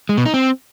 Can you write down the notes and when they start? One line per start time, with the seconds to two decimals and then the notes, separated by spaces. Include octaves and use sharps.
0.09 G#3
0.17 B2
0.26 D#4
0.34 C4